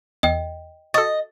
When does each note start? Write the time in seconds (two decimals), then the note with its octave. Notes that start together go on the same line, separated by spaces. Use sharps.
0.23 E2 D#5 G5
0.94 F#4 A4 D#5 A6